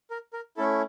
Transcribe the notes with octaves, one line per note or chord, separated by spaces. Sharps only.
A#4
A#4
A3 C#4 E4 A4